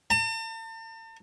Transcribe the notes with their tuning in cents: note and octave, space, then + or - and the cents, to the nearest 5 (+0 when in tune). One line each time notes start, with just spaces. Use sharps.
A5 +45